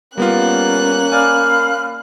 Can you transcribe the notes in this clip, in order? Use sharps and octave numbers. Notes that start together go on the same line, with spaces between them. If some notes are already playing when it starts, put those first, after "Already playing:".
G3 A#3 B3 C#4 F4 F#6
D5 F5 G#5 B5 F6